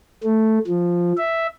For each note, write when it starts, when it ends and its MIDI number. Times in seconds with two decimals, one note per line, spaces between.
0.23 0.58 57
0.67 1.13 53
1.18 1.47 76